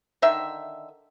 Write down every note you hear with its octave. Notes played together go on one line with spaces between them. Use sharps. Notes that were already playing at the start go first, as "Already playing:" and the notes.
D3 D#3 E5